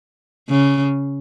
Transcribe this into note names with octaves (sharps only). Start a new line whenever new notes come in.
C#3